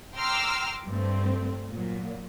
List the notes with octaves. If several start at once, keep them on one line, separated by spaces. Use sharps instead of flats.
G5 A#5 C6 D6 E6 F6
G2 A3 C4
A#2 F#3